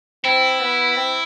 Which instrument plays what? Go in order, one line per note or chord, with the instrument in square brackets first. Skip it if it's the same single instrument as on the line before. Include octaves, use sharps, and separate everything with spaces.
[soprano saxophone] C4 [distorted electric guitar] E4
[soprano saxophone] B3
C4